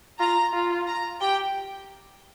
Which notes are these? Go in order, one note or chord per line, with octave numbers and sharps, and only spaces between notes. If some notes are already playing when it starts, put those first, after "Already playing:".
F4 A#5
F4
A#5
G4 G5